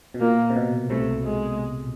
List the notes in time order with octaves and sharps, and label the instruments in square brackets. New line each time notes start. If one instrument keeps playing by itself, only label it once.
[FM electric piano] B2
[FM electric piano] A#2 [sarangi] A#3
[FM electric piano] C3
B2
[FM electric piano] C2 C3 [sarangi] A3
[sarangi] G#3